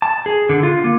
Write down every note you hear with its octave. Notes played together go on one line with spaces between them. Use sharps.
A5
G#4
D3
F4
A#3